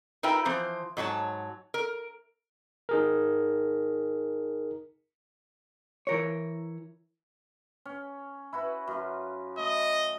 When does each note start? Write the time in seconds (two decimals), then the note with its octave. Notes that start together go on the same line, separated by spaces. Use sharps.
0.23 D#4 F4 A#4 B4 E5 G5
0.45 E3 F3 C4 C5
0.97 G#2 F#3 C#5 A5
1.74 A#4
2.89 D#4 G#4 A#4
6.07 E3 A#4 C#5
7.85 C#4
8.53 E4 F#4 B4
8.87 F#2 F4
9.58 A3 D#5